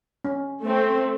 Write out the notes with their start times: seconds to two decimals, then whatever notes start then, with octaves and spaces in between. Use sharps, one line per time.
0.24 C#4
0.63 A3 C4